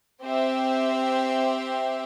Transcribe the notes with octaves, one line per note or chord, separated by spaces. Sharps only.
C4 G4 C5 E5